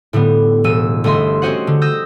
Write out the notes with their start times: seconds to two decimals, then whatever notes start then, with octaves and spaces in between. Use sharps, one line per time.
0.13 A2 D3 G3 B3
0.64 E1 E6 D#7
1.04 G1 A3 D#5 E5 C6
1.42 C4 C#4 F#4 C5 D#5 F#5
1.67 D3
1.82 D#6 E6 G6 A#6